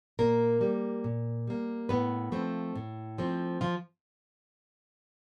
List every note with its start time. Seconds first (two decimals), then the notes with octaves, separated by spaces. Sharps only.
0.19 A#2 A#3 A#4
0.61 G3 A#3
1.04 A#2
1.47 G3 A#3
1.89 A2 B3 B4
2.32 F3 A3 C4
2.76 A2
3.18 F3 A3 C4
3.61 F3 F4